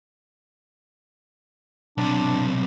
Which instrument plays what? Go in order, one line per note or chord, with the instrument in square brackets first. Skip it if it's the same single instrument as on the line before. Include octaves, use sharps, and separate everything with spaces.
[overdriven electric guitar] B1 C3 [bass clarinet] D4